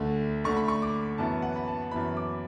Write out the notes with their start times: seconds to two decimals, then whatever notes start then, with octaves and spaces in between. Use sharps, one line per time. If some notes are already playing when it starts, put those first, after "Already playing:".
Already playing: D2 D3 A3
0.44 D2 D3 A3 C#6
0.57 B5
0.68 C#6
0.82 D6
1.18 F#2 E3 B3 E4 A5
1.42 F#5
1.56 B5
1.68 A5
1.91 F#2 E3 B3 E4 B5
2.17 D6